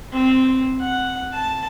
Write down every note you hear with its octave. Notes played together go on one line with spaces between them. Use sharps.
C4
F#5
A5